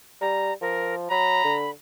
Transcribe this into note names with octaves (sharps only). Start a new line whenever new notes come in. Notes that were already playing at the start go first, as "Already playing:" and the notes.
G3 A#5
F3 A#4
F#3 A#5 B5
D3